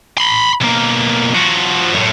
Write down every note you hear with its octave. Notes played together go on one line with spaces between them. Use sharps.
B5 C6
B1 A#3
F3 F#4
F#2 A2